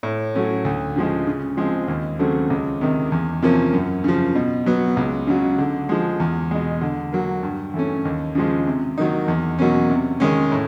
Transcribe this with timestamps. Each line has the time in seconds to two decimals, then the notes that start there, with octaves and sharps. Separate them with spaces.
0.03 A2
0.35 F#3 A3 C#4
0.65 D2
0.96 C#3 F3 G#3
1.27 C#3
1.57 F3 G#3 C4
1.88 D#2
2.19 C#3 F#3 A3 C4
2.50 C#2
2.81 C3 D#3
3.12 E2
3.42 C3 F3 A#3 C#4
3.74 F#2
4.04 C#3 F3
4.35 B2
4.66 F#3 B3
4.97 C#2
5.27 C#3 F#3
5.59 D3
5.89 F3 G#3
6.20 E2
6.51 B2 G#3
6.81 D3
7.13 F#3 A#3
7.43 G2
7.74 E3 A3 C#4
8.05 D#2
8.35 C#3 F3 G#3
8.67 C3
8.98 D#3 F#3 A#3 D#4
9.28 E2
9.59 B2 F#3 A#3 C#4
9.90 C3
10.20 D#3 G#3 C#4
10.52 A2